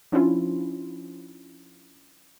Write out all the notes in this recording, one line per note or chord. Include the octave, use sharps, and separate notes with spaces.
F3 C#4 D4 E4 F4